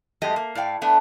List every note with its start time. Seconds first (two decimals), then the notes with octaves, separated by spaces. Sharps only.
0.22 F#2 G#3 A3 G4 D#5
0.36 A#3
0.55 A2 D5 F5 G5
0.82 A3 B3 D4